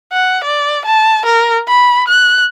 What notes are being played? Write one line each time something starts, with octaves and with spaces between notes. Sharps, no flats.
F#5
D5
A5
A#4
B5
F#6